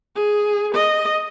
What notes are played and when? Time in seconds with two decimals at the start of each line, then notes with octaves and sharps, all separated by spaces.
0.15 G#4
0.74 D#5